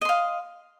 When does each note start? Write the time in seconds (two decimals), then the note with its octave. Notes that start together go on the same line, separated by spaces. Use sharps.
0.01 D#5
0.05 C6
0.09 F5